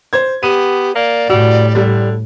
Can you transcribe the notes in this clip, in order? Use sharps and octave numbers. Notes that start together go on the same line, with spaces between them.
C5 G#6
B3 G4 D#7
A#3 D5
A2 G3 F#4
D3 G3